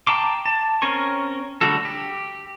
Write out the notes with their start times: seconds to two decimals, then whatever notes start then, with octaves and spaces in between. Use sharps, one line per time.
0.07 G5 A5 A#5 C6 D6
0.46 A5
0.82 C4 C#4 A#4 G#5 C#6
1.61 D3 G3 A3 F#4 A4
1.85 G4